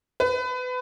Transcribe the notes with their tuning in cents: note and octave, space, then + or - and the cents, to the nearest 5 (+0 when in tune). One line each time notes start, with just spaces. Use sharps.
B4 +30